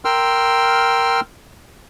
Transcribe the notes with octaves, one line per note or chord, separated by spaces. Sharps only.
A#4 G5 C6 E6 F6